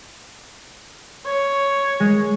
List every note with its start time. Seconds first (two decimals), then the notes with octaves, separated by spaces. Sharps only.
1.26 C#5
2.00 G#3